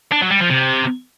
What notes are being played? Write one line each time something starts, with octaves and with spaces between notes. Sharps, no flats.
D4
F#3
G3
F3
C3